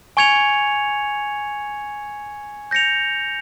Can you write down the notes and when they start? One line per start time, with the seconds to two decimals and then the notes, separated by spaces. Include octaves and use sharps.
0.17 G#5 C#6 G#6 C#7 F7
2.71 G6 A#6 C#7 F7